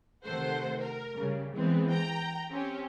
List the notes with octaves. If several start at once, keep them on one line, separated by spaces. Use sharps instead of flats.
C3 D#3 A3 C5 F#5
A#4
C#3 G3
E3 G#3 B3 C4
G5 A#5
C4 C#4 G4